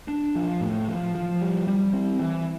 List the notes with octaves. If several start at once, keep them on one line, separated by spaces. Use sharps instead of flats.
D4
F3
A2
F3
F3
G3
G3
C4
E3